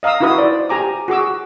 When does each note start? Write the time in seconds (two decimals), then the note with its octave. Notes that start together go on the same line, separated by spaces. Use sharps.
0.03 D#5 F5 A#5 D#6 E6
0.20 D#4 E4 F#4 B4 E5 D#6
0.38 C5 D5
0.69 G4 G#5 A#5 D6
1.08 F#4 G#4 D6 E6